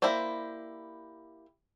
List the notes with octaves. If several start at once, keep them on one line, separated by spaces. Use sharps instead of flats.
A#3 E4 G4 C5 D5